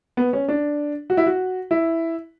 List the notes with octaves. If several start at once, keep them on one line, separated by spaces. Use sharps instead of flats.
B3
C#4
D4
F#4
E4
F#4
E4